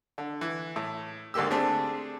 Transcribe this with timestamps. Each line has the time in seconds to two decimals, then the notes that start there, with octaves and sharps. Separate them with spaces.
0.18 D3
0.41 E3
0.76 A2
1.34 D2 G#2 A#3 G4 E6
1.51 A3 C4 D4 G4 G#4